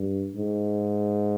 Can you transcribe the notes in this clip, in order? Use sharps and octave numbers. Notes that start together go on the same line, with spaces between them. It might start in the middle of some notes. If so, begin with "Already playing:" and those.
Already playing: G2
G#2